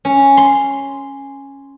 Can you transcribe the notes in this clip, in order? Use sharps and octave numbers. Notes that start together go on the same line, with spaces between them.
C#4
C6